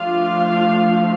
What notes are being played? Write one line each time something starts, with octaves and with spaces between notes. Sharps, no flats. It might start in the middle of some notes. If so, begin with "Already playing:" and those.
Already playing: F3 A3 D4 F4 F5